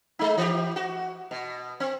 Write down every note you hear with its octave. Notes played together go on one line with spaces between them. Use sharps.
G#3 D#4
E3 G4
F#4
B2
C4